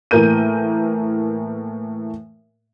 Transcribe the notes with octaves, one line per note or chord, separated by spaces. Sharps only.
A2 E3 A#3 A#4 G6 D#7